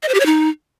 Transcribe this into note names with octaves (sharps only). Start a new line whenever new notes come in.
D#5
C5
G4
C#5
D#4